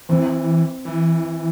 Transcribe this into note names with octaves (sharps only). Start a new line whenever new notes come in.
E3 C4
E3